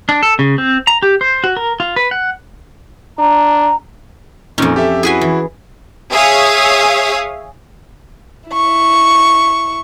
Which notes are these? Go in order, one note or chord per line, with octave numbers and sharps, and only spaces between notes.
D4
A4
C#3
C4
A#5
G4
C5
F#4
A#4
F4
B4
F#5
D4 A#5
F2 A#2 C#4 D#4
G4 A4 E5
E4 F#4 G#4 B4 G#5
E3
G#4 C#5 E5 F5 D#6
E4 C#6